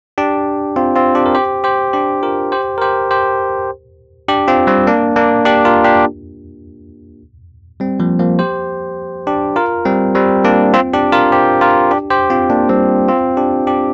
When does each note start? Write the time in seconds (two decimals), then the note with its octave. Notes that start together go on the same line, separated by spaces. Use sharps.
0.18 D4 G4
0.76 C4 F4
0.96 C4 F4
1.15 D4 G4
1.26 A#4
1.35 G4 C5
1.64 G4 C5
1.93 D4 G4
2.23 F4 A#4
2.52 G4 C5
2.78 A#4
2.82 G4 C5
3.11 G4 C5
4.28 D4 G4
4.48 C4 F4
4.67 G3 C4
4.87 A#3 D4
5.16 A#3 D4
5.46 D4 G4
5.65 F4 A#4
5.84 D4 G4
7.80 G3 C4
8.00 F3 A#3
8.19 F3 A#3
8.39 G4 C5
9.27 D4 G4
9.56 F4 A#4
9.85 G3 C4
10.15 G3 C4
10.44 A#3 D4
10.74 C4 F4
10.94 D4 G4
11.12 F4 A#4
11.32 G4 C5
11.61 F4 A#4
11.91 D4 G4
12.11 G4 C5
12.30 C4 F4
12.50 A#3 D4
12.69 G3 C4
13.08 C4 F4
13.37 D4 G4
13.67 D4 G4